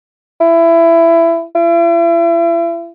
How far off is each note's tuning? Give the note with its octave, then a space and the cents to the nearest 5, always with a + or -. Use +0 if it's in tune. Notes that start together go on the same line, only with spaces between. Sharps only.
E4 +20
E4 +40